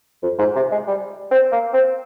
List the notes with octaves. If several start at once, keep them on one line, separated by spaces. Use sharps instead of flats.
F2
G#2
C3
G#3
G3
C4
A#3
C4